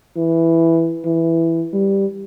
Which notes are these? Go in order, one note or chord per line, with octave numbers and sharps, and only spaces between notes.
E3
E3
G3